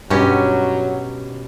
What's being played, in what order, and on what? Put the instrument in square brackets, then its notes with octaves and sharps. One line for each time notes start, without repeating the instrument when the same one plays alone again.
[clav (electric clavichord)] G2 [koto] B2 C#4 G4 [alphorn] F#3